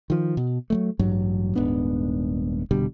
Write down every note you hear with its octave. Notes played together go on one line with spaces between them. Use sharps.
D#3 F3
B2
F#3 G3 A3
A1 G2 F#3
D#1 G#2 B3 D4
F1 B2 D3 G3